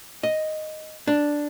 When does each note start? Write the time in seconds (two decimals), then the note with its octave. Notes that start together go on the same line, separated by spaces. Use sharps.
0.23 D#5
1.07 D4